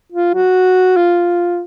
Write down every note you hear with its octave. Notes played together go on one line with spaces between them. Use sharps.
F4
F#4
F4